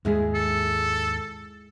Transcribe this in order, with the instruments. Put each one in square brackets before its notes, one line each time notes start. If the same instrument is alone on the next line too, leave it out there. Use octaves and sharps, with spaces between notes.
[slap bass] D#2 G#2 [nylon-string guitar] G#3 E4 G#4
[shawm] A4